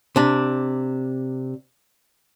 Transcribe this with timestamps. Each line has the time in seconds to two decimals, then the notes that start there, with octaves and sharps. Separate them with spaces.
0.16 C3 D4